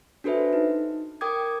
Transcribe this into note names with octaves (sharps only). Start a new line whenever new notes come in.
D4 F#4 A4 B4 C5 E5
D#4
A#4 G5 D6 D#6 G#6